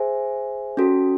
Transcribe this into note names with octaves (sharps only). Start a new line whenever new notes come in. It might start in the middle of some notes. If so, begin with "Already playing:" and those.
Already playing: G#4 C5 E5 G#5
C#4 F#4 A4